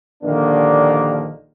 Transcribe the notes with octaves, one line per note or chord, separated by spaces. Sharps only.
A#1 D3 D#3 G3 A#3 D4